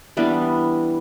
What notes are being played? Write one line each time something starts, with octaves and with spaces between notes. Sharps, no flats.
E3 G3 B3 D4